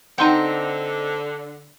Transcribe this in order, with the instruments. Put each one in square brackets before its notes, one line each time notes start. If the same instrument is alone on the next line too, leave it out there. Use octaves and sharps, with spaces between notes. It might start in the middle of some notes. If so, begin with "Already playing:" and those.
[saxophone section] D3 [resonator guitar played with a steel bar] C4 D#4 [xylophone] F#5 C6 D#7 [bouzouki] G5